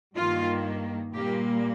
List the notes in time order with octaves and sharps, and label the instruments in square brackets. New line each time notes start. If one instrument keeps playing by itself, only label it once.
[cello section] G2 D#3 A#3 F4
A#2 G3 A#3 G4